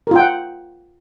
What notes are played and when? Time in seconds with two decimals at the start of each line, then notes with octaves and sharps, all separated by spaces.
0.07 A#4
0.11 F4
0.15 G5
0.20 F#5